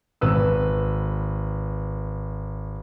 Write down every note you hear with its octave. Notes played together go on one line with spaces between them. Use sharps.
G#1 B4 E6